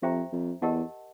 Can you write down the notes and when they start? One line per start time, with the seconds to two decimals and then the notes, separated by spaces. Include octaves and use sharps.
0.02 F2 G4 C5 E5 G5 A#5
0.32 F2
0.62 E2 G4 A#4 D#5 F#5 A5